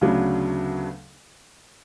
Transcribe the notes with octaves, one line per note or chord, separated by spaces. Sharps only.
D2 C#3 F#3 B3 D4